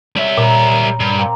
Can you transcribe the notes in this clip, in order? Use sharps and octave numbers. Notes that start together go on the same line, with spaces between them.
G3 C#5 E5
A#2 A#4 B5
G2
A#3 C4